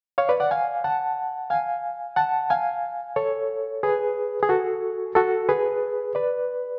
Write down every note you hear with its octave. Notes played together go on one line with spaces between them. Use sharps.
C#5 F5
B4 D5
D5 F#5
F5 G#5
F#5 A5
F5 G#5
F#5 A5
F5 G#5
A4 C#5
G#4 B4
G#4
F#4 A4
F#4 A4
G#4 B4
B4 D5